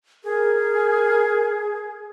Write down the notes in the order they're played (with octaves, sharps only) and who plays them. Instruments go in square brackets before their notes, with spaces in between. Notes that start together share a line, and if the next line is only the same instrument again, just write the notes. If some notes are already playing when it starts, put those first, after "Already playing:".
[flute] G#4 [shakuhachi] A#4